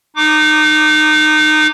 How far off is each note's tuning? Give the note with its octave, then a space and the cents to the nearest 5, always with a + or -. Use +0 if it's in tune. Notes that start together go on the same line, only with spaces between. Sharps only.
D#4 -20 D6 +0